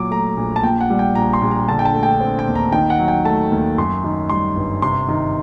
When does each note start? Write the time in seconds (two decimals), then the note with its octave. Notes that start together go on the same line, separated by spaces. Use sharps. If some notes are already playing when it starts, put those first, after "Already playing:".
Already playing: A#2 F#3 D6
0.11 A3 A#5
0.37 A#1
0.56 A5
0.63 A#2 G5
0.81 F#5
0.90 G3
0.99 G5
1.15 A#1 A#5
1.33 C6
1.42 A#1
1.51 A#5
1.69 D3 A5
1.79 G5
1.85 A5
1.94 A3
2.03 G5
2.21 C4
2.39 G5
2.47 D#2
2.55 A#5
2.72 D#3 G5
2.90 F#5
2.99 F#3
3.08 G5
3.25 A3 A5
3.52 D#2
3.78 F#2 C6
4.04 D#3
4.30 G3 C6
4.56 G1
4.82 C3 C6
5.09 D#3